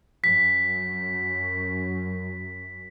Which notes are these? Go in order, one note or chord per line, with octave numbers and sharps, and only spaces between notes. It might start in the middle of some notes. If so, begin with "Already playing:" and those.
F#2 B6